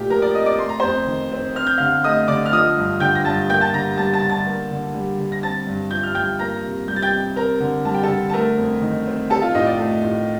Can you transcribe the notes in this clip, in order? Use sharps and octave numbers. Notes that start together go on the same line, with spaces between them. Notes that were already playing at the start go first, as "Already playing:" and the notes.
Already playing: A#2 A3 G4 G5
F3 A#4 A#5
D5 D6
C4 D#5 D#6
D5 D6
A3 C6
A#5
F2 C5 C6
D#3
C4
C4 F6
G6
D3 F5 F6
A3 D#5 D#6
D3 D5 D6
F6
F3 D#5 D#6
G2
D3 G5 G6
A#6
G2 A5 A6
A#3 G5 G6
A5 A6
D3 A#5 A#6
G3 A5 A6
A5 A6
D3
A5 A6
A#3
D3
G3
D3
A#6
C4 A5 A6
G2
F3 G6
F6
G2 G5 G6
A#3 A#5 A#6
C3
G3 G6
A6
G5 G6
C3
C4 A#4 A#5
D3
G3 A5
G5
A4 A5
D3
A5
A3 A#4 A#5
F2
D#3
C4
C4 A4 A5
F4 F5
A2 D#4 D#5
D5
A3
A2